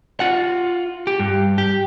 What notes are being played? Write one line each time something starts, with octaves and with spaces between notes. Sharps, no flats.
F4 F#5
G4
G2
G4